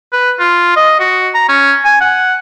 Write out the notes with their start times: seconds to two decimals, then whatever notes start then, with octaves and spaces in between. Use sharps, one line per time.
0.13 B4
0.40 F4
0.76 D#5
1.00 F#4
1.34 A#5
1.49 C#4
1.85 G#5
2.01 F#5